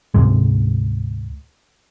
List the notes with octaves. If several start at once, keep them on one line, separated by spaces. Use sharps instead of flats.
D2 G#2 C3 G#3